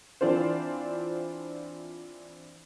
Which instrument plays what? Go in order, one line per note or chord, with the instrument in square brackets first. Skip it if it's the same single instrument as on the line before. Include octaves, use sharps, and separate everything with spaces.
[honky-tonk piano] E3 C4 D4 F4 C5